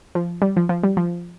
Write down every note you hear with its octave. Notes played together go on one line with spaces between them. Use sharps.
F3
G3
F3
F3
G3
F3